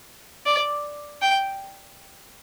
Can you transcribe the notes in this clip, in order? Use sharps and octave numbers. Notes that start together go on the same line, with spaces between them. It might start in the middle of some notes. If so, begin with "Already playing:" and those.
D5
G5